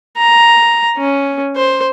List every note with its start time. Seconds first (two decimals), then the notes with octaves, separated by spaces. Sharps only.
0.17 A#5
0.97 C#4
1.56 C5